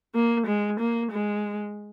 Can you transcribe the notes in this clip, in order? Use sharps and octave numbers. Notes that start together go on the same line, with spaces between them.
A#3
G#3
A#3
G#3